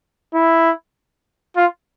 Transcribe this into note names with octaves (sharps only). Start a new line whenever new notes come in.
E4
F4